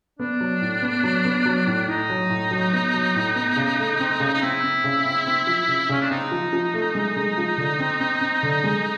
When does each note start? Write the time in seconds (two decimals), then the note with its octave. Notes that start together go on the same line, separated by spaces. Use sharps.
0.19 B3 D4
0.41 F#3
0.61 A2
0.82 B3
1.04 F#3
1.25 B3
1.46 F#3
1.67 A2
1.88 A2 D#4
2.10 F#3
2.30 A2
2.51 F#3
2.73 B3
2.94 F#3
3.15 A2
3.35 B3
3.56 C#3
3.79 A3
4.00 C4
4.20 C#3
4.34 D#4
4.41 C4 E4
4.63 C4
4.84 C#3
5.05 C4
5.26 C4
5.47 F3
5.68 C#3
5.89 C#3 C#4
6.00 D4
6.10 C4 D#4
6.32 F3
6.53 F3
6.74 A3
6.95 G#3
7.17 G#3
7.38 F3
7.58 D3
7.79 C4
8.00 C4
8.21 C4
8.43 D3
8.64 G#3